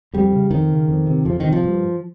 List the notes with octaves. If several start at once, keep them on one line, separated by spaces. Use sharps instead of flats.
F2 G3
C#3
F2 D#3
C#3
F2
C3
F2 F3
C3 D#3
F3
G2